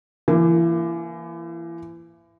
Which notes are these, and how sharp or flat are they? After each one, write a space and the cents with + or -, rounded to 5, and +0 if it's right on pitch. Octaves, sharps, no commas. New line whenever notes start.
E3 +30 A#3 +5